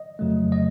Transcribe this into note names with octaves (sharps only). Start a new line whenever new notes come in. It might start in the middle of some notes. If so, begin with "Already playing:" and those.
Already playing: D#5
F2 C#3 F#3 A3
D#5